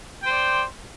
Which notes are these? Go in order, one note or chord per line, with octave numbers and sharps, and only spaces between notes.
C5 D5 G5